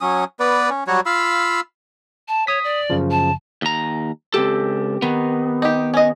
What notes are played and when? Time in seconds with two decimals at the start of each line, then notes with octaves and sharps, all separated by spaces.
0.01 F#3 C#4 D#6
0.40 B3 B4 D5
0.70 C#4
0.87 F#3 G3 F#4 C#5
1.06 F4 F5 B5 E6
2.28 A5
2.47 C#5 D#6 B6
2.64 D5
2.90 F#2 C#3 F3
3.11 A5
3.62 D#2 A#5
4.34 C#2 C4 G4 A4
5.02 D#3 B3
5.62 D#4 G4
5.94 C#4 D#5